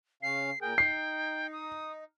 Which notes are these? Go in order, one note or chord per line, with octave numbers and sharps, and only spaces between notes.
C#3 C#4 F5 C7
A#2 G#4 A#4 G5
D#4 C7
D#6